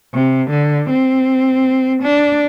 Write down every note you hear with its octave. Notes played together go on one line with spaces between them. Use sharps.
C3
D3
C4
D4